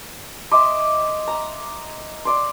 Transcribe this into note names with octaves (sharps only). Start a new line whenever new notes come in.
D#5 E5 C6 D6
A#5
D5 C6